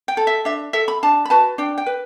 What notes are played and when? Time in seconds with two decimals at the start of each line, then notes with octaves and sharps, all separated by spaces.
0.08 G5
0.17 A4
0.27 E5
0.45 D4 E5
0.73 A4 E5
0.88 B5
1.03 D4 A5
1.25 B5
1.30 F#4 B4 A5
1.58 D4 G5
1.78 G5
1.86 B4